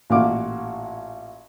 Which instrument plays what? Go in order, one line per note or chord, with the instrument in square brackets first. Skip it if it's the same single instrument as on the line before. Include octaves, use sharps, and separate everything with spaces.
[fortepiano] A1 A#2 F#4 F5 D6